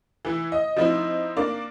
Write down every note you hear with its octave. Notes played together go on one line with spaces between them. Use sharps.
E3 E4
D#5
F3 C4 D#4 E4
A#3 D4 D5